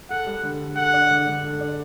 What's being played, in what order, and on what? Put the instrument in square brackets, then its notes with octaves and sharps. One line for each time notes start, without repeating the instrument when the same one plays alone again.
[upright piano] A4 [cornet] F#5
[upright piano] G3
D3
A4
[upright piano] A4 [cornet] F#5
[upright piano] D4
D3
D3
A4
D4